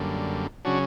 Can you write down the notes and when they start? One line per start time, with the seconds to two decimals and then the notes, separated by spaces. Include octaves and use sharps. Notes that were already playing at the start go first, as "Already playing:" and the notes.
Already playing: F#2 D3 G3 A#3
0.65 C#3 F#3 C#4 D4 F#4